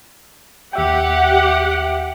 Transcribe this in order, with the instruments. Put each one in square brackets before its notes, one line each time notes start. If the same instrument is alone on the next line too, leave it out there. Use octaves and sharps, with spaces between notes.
[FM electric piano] D#2 E5 G5 [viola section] G4 F#5